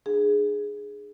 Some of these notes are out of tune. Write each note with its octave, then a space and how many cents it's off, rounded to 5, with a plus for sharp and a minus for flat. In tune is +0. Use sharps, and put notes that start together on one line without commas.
D4 +35 G#4 +0